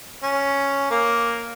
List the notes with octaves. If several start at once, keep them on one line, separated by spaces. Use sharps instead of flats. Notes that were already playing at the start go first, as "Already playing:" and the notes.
C#4
A#3